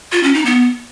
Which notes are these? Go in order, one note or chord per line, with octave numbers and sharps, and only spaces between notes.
F4
C#4
D#4
B3